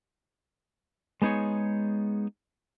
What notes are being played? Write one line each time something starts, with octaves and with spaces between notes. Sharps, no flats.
G#3 B3 D#4 G#4 C#5